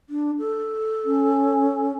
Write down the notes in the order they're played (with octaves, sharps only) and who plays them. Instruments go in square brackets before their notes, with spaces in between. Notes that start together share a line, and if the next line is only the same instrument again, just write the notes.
[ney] D4
A4
[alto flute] C#4